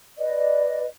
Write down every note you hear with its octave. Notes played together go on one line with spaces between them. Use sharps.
B4 D5 D#5